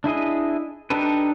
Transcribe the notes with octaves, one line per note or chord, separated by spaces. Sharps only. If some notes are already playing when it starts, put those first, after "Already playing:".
D4 E4 G#4 D#5
D4 D#4 G4 A4 B4